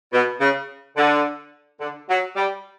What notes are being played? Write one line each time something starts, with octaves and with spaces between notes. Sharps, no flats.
B2
C#3
D3
D3
F#3
G3